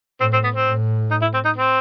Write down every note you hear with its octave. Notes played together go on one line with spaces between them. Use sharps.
A2 C4
C4
B3
C4
A2
D#4
E4
C4
D#4
C4